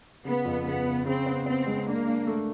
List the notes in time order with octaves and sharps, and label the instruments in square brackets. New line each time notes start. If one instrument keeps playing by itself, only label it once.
[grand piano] C#3 [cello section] B3
[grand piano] F2
[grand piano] C#3 [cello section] B3
[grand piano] C#3
[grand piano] C#3 [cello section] C4
[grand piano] B3
[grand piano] B3 [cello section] C4
[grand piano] G#3
[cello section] A#3 [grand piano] D4
[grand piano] D4
A3